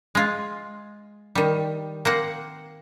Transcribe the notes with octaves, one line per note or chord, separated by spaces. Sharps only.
G#3 F4
D#3 G3
A#3 C4 F#5